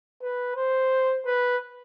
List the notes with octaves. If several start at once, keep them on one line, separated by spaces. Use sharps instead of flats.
B4
C5
B4